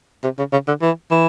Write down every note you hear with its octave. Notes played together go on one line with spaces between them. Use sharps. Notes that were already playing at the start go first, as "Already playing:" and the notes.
C3
C#3
C#3
D3
E3
E3